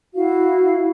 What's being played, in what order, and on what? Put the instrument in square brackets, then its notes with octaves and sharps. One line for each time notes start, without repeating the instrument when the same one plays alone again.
[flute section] E4 F#4 F5